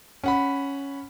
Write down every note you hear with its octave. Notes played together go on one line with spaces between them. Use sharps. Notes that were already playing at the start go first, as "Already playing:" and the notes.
C#4 F#5 B5